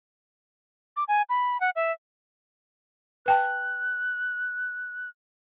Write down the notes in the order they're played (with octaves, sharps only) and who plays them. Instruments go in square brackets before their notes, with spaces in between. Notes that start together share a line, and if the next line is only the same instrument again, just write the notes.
[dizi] D6
G#5
B5
F#5
E5
[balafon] B4 G5 A5 [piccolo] F#6